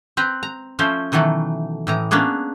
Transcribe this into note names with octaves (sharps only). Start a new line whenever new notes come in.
C4 B4 A#5
A#5
F3 A3 C#4 C5
B2 D#3 E3 F#3 A3
A2 E3 A#5
A#3 B3 C#4 D4 G#4